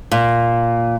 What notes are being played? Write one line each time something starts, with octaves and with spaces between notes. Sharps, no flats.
A#2